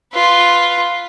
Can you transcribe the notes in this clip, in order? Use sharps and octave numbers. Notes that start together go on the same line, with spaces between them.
F4 B4